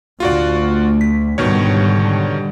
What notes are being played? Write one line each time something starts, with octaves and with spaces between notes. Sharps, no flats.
D2 F4 F#4 D5
B6
G#2 B2 D3 D#3 G3 C#5